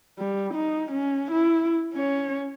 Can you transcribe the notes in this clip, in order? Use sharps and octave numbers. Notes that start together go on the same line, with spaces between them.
G3
D#4
C#4
E4
C#4 C#5